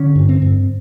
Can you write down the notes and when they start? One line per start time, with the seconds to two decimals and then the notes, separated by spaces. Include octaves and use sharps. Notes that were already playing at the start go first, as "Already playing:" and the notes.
Already playing: D3 C#4
0.16 G2
0.29 C4
0.42 G2